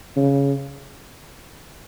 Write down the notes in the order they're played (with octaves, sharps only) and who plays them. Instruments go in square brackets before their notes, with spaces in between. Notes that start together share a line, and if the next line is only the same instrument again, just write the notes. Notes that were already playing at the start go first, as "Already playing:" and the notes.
[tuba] C#3